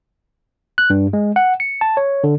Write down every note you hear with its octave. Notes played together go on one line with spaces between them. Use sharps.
F#6
G2
G#3
F#5
C#7
A5
C#5
D3